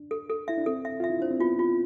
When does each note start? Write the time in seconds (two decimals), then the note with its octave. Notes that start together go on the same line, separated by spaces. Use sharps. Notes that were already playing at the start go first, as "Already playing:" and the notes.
Already playing: D4
0.11 A4
0.30 A4
0.48 E4 E5
0.58 D4
0.66 C4 A4
0.85 E5
1.00 F4 E5
1.10 E4
1.20 D4 C5
1.31 C4
1.40 B3 F4
1.59 F4